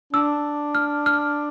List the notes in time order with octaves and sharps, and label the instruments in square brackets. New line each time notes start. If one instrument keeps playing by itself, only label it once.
[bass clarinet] D4 [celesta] E6
[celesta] F6
F6